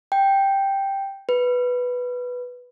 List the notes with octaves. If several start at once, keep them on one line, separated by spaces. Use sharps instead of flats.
G5
B4